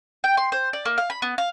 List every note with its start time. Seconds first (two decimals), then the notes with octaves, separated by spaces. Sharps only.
0.24 G5
0.37 C6
0.52 C5
0.73 D5
0.85 A#3
0.98 F5
1.10 B5
1.22 B3
1.38 F5